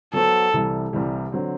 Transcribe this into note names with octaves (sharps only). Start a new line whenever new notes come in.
F#3 B3 F#4 A4 C5
C2 C3 E3 G3
C2 C3 E3 G3
D3 F#3 C4